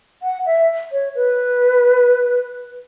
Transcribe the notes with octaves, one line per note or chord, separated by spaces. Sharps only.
F#5
E5
C#5
B4